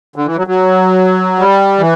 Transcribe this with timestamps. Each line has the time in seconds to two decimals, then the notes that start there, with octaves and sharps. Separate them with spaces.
0.16 D3
0.26 E3
0.37 F#3
0.47 F#3
1.39 G3
1.79 E3